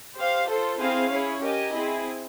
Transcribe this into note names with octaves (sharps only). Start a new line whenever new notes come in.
G4 C5 F5
F4 A4 C5
C4 E4 G#4 C5 F5
C#4 E4 G#4 C#5
G4 A#4 D#5 G#5
C4 E4 G#4